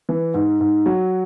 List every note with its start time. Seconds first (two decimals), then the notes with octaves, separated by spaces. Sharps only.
0.09 E3
0.34 G#2
0.60 G#2
0.86 F#3